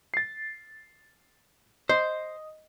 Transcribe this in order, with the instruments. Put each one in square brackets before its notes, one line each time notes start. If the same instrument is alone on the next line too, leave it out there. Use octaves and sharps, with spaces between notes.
[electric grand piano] A6 C7
[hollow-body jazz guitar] C5 [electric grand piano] D#5